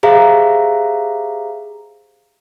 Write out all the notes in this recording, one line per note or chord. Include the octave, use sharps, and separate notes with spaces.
G4 G#4 C5 E5 F5 A#5